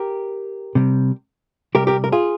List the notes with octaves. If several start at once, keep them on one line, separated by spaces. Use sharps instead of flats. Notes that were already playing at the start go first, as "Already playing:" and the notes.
Already playing: G4 A#4
C3 G3
C3 G3 G4 A#4
G4 A#4
A#4
F4 G#4